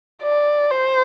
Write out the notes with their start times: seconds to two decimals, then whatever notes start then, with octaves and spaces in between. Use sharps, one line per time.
0.22 D5
0.71 C5